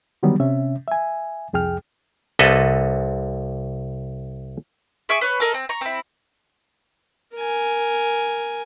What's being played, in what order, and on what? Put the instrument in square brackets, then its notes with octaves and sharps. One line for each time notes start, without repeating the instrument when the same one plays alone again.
[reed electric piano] D3 D#3 F#3 G3 B3
C3 C#4 E5
E5 G#5
C2 F2 G#4 G5 F6
[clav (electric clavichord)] C2 A4 B4 D#5
[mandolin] G#4 E5 C#6 D6
B4 C#5
A4 A#4 D#5
C4
A#5 C#6
C4 E4
[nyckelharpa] A#4 G#5